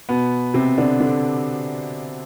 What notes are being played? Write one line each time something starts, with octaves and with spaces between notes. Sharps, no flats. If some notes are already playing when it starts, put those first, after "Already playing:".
B2 B3
C3 C4
D3 D4
D3 D4